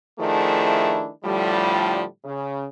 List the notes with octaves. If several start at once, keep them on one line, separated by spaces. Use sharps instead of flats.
D#3 F3 A3 D4 E4 G#4
A2 D3 F3 G3
C#3